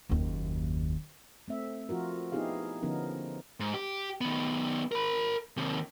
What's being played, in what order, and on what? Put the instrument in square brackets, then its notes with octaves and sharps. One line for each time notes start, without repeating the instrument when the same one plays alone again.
[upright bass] F#1 D#2
[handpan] A3 C4 E5
F3 F4 F#4 A#4
B3 D#4 E4 G4 G#4 F5
D3 F3 B3 C#4 D#4 A#4
[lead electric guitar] G#2
G4
D#3 B3
A#4 B5
D#2 C3